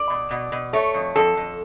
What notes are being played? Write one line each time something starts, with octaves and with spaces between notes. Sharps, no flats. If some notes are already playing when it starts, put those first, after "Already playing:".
Already playing: D5
B2
B2
B2
A3 C#5
F2
F2 A4
F2